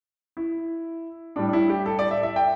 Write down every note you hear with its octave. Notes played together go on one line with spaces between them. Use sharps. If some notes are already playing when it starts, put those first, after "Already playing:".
E4
A2 G3 D4
D4
E4
G4
A4
D5
E5
E5
G5